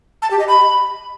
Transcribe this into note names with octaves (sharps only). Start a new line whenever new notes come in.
A5
G4
D#5
B5